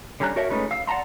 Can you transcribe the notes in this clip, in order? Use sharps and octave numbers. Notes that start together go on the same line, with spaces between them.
D3 G3 C#4 A#5 F#6
F#4 A#4 C#5 E5 A5
G#3 A3 C#4 D#4 B4
F5 E6
D5 F#5 A5 A#5 C6